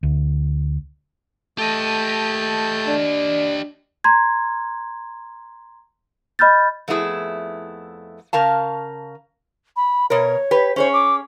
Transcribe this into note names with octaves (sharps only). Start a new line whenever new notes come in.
D2
A3 G4 D#5 A5 G6
D4
A#5 C6 G#6
D#5 B5 F6 G6 A6
F2 A3 B3 E4 G#4
C#3 A#4 F5 A5
B5
B2 A#4 C#5
G4 B4
C#4 G#4 C5 C#5
D6